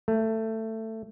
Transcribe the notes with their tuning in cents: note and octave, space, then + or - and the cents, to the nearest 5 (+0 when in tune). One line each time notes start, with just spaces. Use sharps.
A3 +15